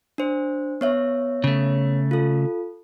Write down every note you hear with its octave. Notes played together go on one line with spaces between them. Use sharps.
D4 C5
B3 C#5 E5
C#3 A3
F4 A4